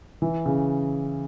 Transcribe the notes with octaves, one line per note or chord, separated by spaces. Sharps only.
E3
C#3